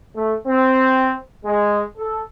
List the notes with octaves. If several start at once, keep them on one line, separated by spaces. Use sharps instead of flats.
A3
C4
G#3
A4